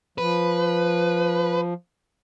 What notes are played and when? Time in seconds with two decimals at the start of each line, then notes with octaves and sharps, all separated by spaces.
0.18 F3 B4